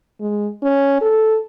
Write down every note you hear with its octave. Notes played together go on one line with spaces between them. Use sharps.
G#3
C#4
A4